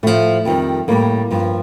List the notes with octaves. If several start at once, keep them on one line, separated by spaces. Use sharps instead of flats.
A2 F3 A3
F2 D#3 G3
A2 G3 A#3
G2 F3